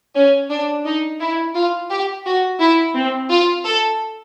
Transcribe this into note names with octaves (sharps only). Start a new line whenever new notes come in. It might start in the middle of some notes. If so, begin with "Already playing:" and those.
C#4
D4
D#4
E4
F4
G4
F#4
E4
C4
F4
A4